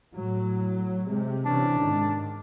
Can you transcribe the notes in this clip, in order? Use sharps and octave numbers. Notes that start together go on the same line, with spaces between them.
A2 F#3
C3 G#3
C3 E3 C#4 D4
G#2 D#3